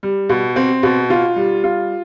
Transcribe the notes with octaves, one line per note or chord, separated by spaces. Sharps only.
G3
B2
C4
B2
F4
G3
F4